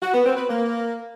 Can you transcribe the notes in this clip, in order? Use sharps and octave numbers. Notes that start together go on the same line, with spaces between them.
F#4
B3
C4
B4
A#3